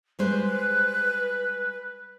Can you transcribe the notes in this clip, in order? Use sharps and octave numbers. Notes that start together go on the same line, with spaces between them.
G3 G#3 B4 C5